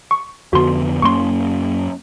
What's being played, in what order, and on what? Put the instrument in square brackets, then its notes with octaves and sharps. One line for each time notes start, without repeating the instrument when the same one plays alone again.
[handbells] C#6
[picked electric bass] F2 D3 B3 [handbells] F#4 C6
[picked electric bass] F#2 A#3 C#4 [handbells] C6 C#6